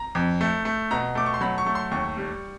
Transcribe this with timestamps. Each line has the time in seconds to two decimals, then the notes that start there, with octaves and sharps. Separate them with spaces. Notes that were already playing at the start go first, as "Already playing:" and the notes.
Already playing: A#5
0.15 F2
0.41 A3
0.65 A3
0.91 B2 A#5
1.15 A3 D6
1.26 C#6
1.34 C6
1.41 F#3 B5
1.58 C#6
1.66 A3
1.75 C6
1.91 D#2 C#6
2.17 G3